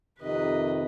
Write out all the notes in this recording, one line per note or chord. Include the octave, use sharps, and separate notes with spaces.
F2 C3 D#3 B4 D#5